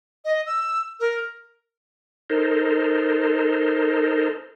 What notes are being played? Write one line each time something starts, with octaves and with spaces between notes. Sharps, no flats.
D#5
E6
A#4
D#4 A4 A#4 C5